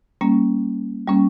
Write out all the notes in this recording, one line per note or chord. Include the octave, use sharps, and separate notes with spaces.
G3 A#3 C#4
G3 A#3 C#4